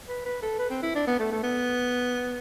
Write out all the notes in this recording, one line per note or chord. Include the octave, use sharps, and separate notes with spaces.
B4
B4
A4
B4
C4
E4
D4
B3
A3
A3
B3